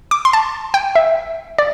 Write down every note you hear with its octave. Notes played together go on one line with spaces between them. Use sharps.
D6
C6
A5
G5
E5
D5